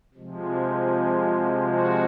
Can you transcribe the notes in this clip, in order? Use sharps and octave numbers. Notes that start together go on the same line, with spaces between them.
C3 F3 G#3
F#4
F4
F#4
F#4